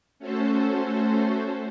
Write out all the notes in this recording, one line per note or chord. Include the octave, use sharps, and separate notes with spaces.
A3 C#4 F#4 A4 C5